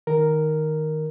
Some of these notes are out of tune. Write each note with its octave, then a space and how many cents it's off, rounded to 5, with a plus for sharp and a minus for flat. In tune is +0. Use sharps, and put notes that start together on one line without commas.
D#3 +0 A#4 +0